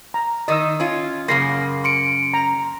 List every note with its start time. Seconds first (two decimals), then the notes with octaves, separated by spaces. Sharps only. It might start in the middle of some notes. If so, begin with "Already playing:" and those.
0.14 A#5
0.48 D#3 D#4 D#5 D#6 E6
0.80 C#4 F4
1.28 F#2 C#3 A#3 C6 A#6 C7
1.84 C6 C#7 D7
2.34 A#5